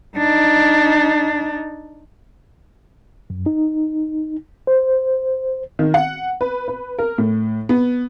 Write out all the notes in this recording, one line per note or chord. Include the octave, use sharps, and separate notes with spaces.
D4 D#4
F#2
D#4
C5
D#3
F#5
B4
B4
A#4
A2
B3